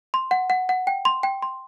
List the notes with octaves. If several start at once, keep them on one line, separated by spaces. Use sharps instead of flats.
C6
F#5
F#5
F#5
G5
C6
G5
C6